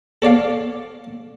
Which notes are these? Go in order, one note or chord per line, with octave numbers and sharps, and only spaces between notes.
A4 C#5 D5 F5